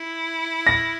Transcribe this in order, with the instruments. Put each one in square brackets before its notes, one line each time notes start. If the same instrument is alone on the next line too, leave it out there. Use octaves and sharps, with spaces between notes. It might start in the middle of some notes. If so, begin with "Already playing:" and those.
Already playing: [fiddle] E4
[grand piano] A#6